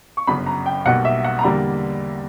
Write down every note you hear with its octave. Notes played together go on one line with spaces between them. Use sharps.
C#6
G1 F#2 C#3 B5
A#5
G5
B1 B2 G3 A#3 F#5
E5
F#5
A#5
E2 D3 G3 A#3 B5